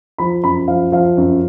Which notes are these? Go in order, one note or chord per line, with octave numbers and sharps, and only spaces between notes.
F3 B5
F#2 B5
F3 F5
F3 F5
F#2